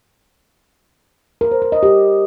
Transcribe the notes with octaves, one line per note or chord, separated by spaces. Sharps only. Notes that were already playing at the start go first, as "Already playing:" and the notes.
A#4
C5
A#4
D#5
G4